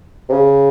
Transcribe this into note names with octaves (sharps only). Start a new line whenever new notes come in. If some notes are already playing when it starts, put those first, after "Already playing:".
C3
C#3